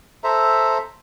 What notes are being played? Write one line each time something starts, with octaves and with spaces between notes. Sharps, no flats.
A4 C5 E5 A#5